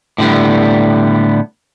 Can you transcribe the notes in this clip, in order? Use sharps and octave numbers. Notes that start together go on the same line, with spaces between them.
A2 D3 G3 B3